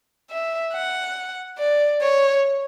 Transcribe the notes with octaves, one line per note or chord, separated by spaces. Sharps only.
E5
F#5
D5
C#5